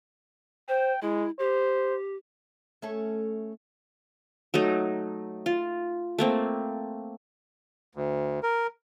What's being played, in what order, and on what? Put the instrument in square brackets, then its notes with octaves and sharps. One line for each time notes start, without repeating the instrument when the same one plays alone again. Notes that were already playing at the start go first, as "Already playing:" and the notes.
[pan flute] C5 [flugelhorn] G5
[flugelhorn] G#3 [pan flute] E4
[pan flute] G4 [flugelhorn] C5
[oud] A3 C#4 A4
[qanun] F#3 A3 D#4
F4
A3 A#3 C4
[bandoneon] D2
A#4